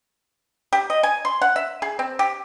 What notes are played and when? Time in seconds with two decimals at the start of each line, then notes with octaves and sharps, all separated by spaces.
0.73 G4
0.90 D#5
1.03 G#5
1.25 C6
1.41 F#5
1.56 E5
1.82 G#4
1.99 C4
2.19 G4